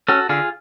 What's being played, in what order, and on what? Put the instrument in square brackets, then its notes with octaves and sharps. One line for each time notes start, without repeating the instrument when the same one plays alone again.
[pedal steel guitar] C#4 F#4 A4
D3 F4 G#4